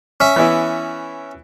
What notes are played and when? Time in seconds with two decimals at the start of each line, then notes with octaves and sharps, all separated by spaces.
0.20 C#4 E5
0.36 E3 B3 E4